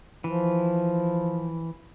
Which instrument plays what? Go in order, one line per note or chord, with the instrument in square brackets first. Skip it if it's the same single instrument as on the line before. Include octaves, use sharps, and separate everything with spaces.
[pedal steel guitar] E3 [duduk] F3